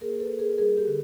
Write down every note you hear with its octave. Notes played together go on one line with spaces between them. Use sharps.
A#3 G#4 A#4
A4 B4
A#3
G#4 A#4
G3 G#4 A#4
G4 A4
D3